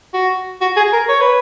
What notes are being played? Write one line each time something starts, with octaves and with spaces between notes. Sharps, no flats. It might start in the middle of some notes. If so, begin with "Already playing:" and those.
F#4
F#4
G#4
A#4
C#5
B4